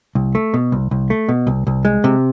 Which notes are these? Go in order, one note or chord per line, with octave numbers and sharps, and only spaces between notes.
C2
A3
B2
C2
C2
A3
B2
C2
C2
G#3
C3